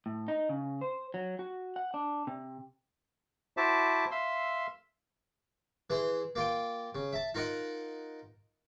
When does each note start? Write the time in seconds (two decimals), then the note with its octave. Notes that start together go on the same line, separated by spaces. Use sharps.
0.06 A2
0.28 D#4
0.49 C#3
0.81 C5
1.14 F#3
1.39 F#4
1.76 F#5
1.94 D4
2.27 C3
3.57 E4 F#4 C5 E5 A5 D6
4.11 E5 F5 C6 E6
5.90 E3 G#4 C5
6.35 A#3 F4 G5
6.95 C#3
7.13 E5 A5
7.34 D#4 F4 A#4 D#5 F#5